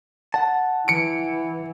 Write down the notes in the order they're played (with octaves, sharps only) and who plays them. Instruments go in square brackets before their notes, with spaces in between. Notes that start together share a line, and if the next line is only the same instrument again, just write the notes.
[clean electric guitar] F#5 A5
[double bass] E3 [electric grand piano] C#7 D7